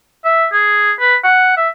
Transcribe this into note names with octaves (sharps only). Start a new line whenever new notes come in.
E5
G#4
B4
F#5
E5